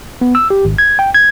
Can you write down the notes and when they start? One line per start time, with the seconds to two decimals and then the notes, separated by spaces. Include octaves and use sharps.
0.21 B3
0.35 E6
0.50 G4
0.65 G#1
0.78 G#6
0.99 G5
1.14 G#6